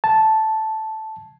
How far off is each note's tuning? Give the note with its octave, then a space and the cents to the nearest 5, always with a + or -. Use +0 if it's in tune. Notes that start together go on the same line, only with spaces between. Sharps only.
A5 -5